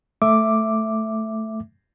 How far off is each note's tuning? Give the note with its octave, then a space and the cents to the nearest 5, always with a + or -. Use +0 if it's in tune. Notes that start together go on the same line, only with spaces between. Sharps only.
A3 +0 E5 +0 D6 +0